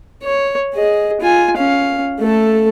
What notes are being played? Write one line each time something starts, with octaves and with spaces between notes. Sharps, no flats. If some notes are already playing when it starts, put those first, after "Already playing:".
C#5
G#4 D#5
F4 G#5
C#4 F5
A3 A4